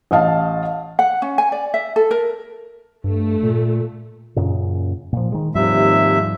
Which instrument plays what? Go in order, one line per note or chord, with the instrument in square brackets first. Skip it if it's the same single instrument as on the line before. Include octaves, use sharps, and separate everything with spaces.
[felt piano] A1 D#5 F5 A5
[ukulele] F#5
C#4
G#5
D5
E5
A4
A#4
[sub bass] G2 [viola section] A3
[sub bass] A#2
[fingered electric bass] F#2 A#2 C#3
A#2 F3
D#3 G#3
[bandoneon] D#2 C3 E5 [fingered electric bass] G#2 F3 G3